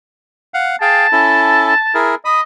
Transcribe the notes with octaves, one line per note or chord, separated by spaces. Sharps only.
F5 F#5
G#4 F5 G5 A5
C#4 E4 A4
E4 G#4 A#4
D#5 B5 D#6